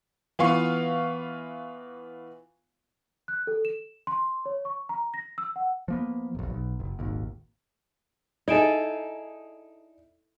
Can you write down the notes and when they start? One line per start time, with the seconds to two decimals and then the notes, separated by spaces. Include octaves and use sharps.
0.39 E3 B3 F4 F5 C#6
3.28 F#6
3.47 A4
3.65 E7
4.07 C6
4.46 C#5
4.65 C#6
4.89 A#5
5.14 A#6
5.38 E6
5.56 F#5
5.88 F3 A#3 B3
6.35 F1 A#1
6.50 B1
6.80 F#1
6.99 D#1 G#1 D#2
8.48 D#4 E4 G#4 A4 D5 D7 E7